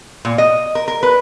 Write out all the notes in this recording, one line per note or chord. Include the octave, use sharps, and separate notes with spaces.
A#2
D#5
A#4
A#4
B4